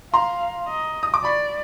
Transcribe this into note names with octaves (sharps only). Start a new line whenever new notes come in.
F5 A#5 C6
D#5
D#6
D6
D5 B5 C#6